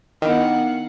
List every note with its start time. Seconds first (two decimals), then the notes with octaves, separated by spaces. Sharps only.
0.22 D#3 B3 D4 E4 F5 F#5